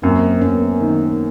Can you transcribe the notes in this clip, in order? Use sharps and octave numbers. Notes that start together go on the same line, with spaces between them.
F#2 A#3 C4
F#2 B3 C#4
D#3